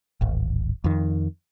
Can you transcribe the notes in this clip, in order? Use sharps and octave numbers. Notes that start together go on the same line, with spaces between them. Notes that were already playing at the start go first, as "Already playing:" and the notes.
D1 G#1
F2 D#3